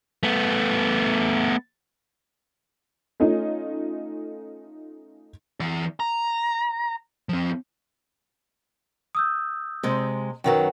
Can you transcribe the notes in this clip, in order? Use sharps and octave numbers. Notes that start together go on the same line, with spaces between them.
A3 B3
A3 C#4 D#4 F4
E3 D5
A#5
F3 C4
D#6 E6 G6
C3 G#3
F#2 D#3 F#3 B4 F#5 G5